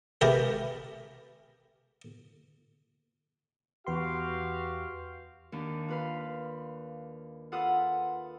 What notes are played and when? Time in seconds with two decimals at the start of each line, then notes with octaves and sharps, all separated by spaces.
0.21 G#3 A3 G4 A#4 B4
3.87 E2 F#4 G4 B4 F5 C6
5.52 D#2 D#3 D4
5.88 F4 B4 F5
7.52 F4 A4 B4 F#5 D#6 F6